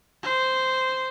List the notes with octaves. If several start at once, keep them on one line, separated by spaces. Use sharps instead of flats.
C5